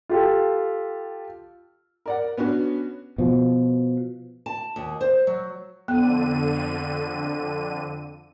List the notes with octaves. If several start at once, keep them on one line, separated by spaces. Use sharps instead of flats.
F4 G4 A4
A#4 D5 F#5
B3 C#4 D4 F#4
B2 F3
A5
D#2
C5
F#3
F2 D3 B3 D#7